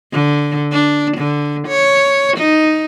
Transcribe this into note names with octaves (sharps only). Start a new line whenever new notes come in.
D3
D4
D3
C#5
D#4